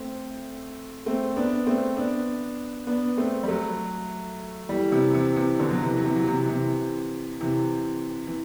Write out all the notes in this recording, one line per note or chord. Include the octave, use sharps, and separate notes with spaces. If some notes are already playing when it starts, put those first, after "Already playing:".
Already playing: A3 C4
A3 C4
B3 D4
A3 C4
B3 D4
B3 D4
A3 C4
G3
F#3 A3
E3 G3
C3 E3
C3 E3
C3 E3
B2 D3
F#3
C3 E3
F#3
C3 E3
F#3
C3 E3
C3 E3
C3 E3
E3